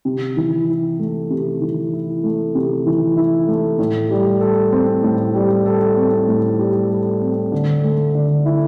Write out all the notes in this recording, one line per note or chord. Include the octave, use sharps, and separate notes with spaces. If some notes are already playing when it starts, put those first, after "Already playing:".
C3
E3
E4
A3
C3
E3
E4
A3
C3
E3
E4
A3
A2
G3
A4
C4
A2
G3
A4
C4
A2
G3
A4
C4
D3
A3
D3
E4